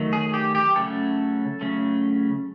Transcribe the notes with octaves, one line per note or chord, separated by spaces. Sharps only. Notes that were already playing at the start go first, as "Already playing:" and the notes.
Already playing: D#3 F#3 A3
G#4
G4
G4
C#3 F#3 A3 C#4 A4
C#3 F#3 A3 C#4